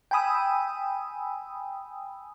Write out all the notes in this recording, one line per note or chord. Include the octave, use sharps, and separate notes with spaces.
G5 G#5 B5 D#6 E6